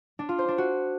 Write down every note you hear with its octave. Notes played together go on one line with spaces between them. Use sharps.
D4
F4
C5
D4
F#4